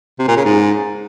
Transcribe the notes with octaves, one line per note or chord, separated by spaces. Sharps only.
C3
A#2
C#3
G#2